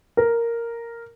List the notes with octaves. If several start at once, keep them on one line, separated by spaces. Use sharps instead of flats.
A#4